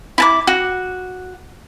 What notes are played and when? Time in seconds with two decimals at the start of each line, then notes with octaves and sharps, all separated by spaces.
0.18 E4 A5 D6
0.47 F#4